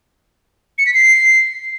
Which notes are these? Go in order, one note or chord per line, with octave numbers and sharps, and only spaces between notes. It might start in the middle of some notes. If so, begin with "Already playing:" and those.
C#7
B6
C7